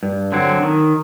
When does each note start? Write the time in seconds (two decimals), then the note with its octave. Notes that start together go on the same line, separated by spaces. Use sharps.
0.03 G2
0.32 D3 F#3 C4
0.62 D#3